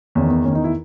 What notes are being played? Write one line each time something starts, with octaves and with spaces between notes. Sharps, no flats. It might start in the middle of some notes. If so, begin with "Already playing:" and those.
E2 D#3 C#4
B3
E2 D#3 C#4
D#4
E4